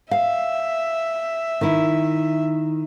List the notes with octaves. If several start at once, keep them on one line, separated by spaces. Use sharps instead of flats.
E5 F5
D#3 E4